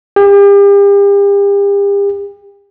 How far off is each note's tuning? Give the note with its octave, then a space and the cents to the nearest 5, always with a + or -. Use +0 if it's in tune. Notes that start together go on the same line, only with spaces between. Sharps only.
G4 +40